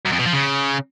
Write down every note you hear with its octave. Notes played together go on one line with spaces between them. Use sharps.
F#2
F2
B2
F3
C#3